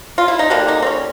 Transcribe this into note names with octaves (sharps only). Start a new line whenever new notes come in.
F4
E4
D#4
D3 G3 A#3 D4
D#4
C4
C#4